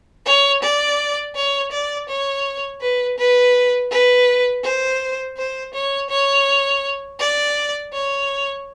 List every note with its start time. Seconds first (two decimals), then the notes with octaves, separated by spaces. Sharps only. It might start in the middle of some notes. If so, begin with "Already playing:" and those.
0.26 C#5
0.63 D5
1.36 C#5
1.72 D5
2.09 C#5
2.81 B4
3.18 B4
3.91 B4
4.64 C5
5.37 C5
5.74 C#5
6.10 C#5
7.20 D5
7.93 C#5